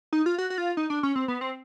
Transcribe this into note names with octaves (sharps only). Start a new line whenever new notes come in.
D#4
F4
F#4
F#4
F4
D#4
D4
C#4
C4
B3
C4